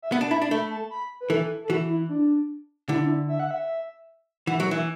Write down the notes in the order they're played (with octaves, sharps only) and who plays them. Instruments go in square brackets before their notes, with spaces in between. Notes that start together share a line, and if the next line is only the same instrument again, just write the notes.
[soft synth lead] E5
[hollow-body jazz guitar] B3 [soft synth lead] F#5
[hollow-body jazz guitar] D4 [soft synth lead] A5
[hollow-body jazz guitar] E4 [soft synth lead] B5
[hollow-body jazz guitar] D4
[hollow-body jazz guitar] A3 [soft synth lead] B5
[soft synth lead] A5
B5
B4
[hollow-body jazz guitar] E3 [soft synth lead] A4
[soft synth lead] A4
[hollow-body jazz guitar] E3 [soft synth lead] F#4
[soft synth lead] E4
D4
[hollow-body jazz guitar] D3 [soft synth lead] E4
[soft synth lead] D4
E4
E5
F#5
E5
[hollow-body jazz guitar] E3 [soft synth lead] F#5
[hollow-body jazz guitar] F#3
E3